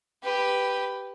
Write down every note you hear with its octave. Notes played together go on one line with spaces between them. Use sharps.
G4 B4